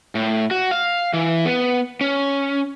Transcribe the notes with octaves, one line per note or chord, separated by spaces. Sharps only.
A2
F#4
F5
E3
B3
C#4